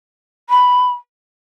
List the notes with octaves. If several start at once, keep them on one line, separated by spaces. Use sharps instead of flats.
B5